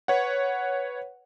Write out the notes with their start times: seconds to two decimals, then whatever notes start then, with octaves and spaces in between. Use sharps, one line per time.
0.08 B4 C#5 F#5